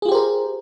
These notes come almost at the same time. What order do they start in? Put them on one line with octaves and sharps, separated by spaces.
G#4 F4 G4 C5 A#4